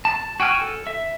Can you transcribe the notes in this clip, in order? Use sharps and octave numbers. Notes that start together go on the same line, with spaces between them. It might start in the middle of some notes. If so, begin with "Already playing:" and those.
A5
F#4 G5 G#5 F6
A4
E5